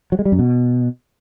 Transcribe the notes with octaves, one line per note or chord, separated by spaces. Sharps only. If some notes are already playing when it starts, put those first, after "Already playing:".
F#3
G#3
G3
F#2
B2